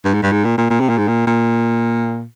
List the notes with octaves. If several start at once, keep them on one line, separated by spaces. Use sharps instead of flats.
G2
G#2
G2
G#2
A#2
A#2
A#2
C3
A#2
G#2
A#2
A#2